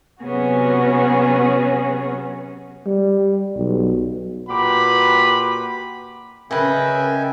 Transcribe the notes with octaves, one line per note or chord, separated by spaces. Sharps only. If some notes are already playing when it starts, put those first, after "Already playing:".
C3 F#3 B3 C#4 F#4 G#4
G3
B1
A#2 F#4 G4 B4 B5
C#3 A#4 B4 D#5 E5 G5 G#5